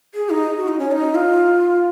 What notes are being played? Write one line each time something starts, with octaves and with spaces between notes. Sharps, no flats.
G#4
D#4
F#4
D#4
C#4
D#4
F4